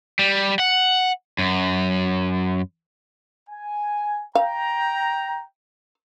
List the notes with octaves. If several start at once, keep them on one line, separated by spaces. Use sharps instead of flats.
G3
F#5
F#2
G#5
F5 G5 A#5